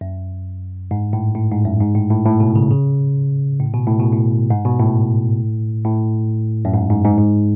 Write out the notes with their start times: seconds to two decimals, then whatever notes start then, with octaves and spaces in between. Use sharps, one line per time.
0.01 F#2
0.91 G#2
1.13 A2
1.35 A2
1.51 G#2
1.65 F#2
1.81 G#2
1.95 A2
2.11 A2
2.25 A2
2.40 B2
2.56 C#3
2.71 C#3
3.60 A2
3.73 B2
3.87 A2
4.00 B2
4.12 A2
4.50 G#2
4.65 B2
4.80 A2
5.85 A2
6.65 F#2
6.74 G#2
6.90 G#2
7.04 G#2
7.18 G#2